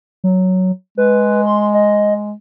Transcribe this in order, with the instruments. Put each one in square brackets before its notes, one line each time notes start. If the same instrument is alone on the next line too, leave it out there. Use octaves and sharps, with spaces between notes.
[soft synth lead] F#3
[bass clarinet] G#3 [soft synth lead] B4
[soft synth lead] C6
D#5